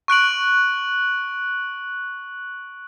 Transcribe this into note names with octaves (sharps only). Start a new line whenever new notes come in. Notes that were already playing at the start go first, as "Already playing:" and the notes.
C#6 F#6 D7 F#7